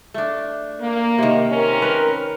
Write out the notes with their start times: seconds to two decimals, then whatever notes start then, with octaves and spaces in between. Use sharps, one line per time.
0.14 A3 D4
0.81 A#3
1.18 C3 D#3
1.51 C4 C#4 A#4
1.82 B4